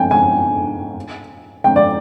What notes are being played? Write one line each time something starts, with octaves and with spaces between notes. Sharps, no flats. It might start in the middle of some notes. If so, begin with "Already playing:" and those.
Already playing: G5 G#5
G#5
G5
D5